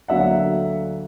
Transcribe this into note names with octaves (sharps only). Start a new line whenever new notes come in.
D2 D3 F#3 A#3 E5 F#5